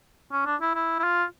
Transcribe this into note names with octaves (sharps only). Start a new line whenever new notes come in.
C#4
D4
E4
E4
E4
F4